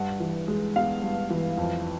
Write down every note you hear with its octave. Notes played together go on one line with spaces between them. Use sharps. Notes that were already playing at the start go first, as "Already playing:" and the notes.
Already playing: G2 F#5
E3
G#3
B3 F5
G2
E3
F2